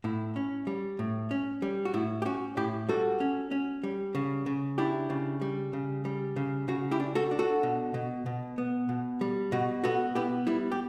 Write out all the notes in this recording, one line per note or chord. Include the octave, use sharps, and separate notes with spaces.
A2 E4
C#4
G3
A2
C#4
G3
F#4
A2 E4
G4
C#4 F#4
A2 E4 G4
G3 F#4 A4
C#4
C#4
G3
C#3
C#3
D4 E4 G4
C#3
G3
C#3
G3
C#3
C#3 F#4
E4 G4
D4
F#4 A4
D4
F#4 A4
B2
B2
B2
B3
B2
G3
B2 F#4
B3 F#4 A4
B3 E4 G4
G3 E4
G4